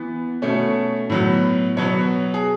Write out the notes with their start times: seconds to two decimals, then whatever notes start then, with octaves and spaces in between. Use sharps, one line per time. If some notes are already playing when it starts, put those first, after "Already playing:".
Already playing: E3 B3
0.42 B2 A3 C#4
1.10 A2 F#3 B3
1.77 B2 F#3 B3 C#5
2.34 G#4